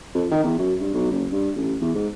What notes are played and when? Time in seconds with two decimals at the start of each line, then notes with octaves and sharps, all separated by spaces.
0.14 F2
0.31 D#3
0.44 E2
0.59 F#2
0.80 G2
0.94 B1
1.11 F#1
1.32 G2
1.56 A1
1.81 E2
1.95 G#2